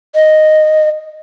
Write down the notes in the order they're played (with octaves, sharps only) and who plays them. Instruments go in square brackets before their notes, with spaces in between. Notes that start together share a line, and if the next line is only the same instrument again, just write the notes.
[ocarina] D#5